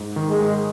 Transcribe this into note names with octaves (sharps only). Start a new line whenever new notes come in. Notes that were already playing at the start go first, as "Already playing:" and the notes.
Already playing: G#2
D#3
G#3
G#2